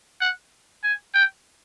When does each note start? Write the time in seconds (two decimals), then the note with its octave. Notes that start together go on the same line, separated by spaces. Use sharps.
0.21 F#5
0.84 G#5
1.14 G5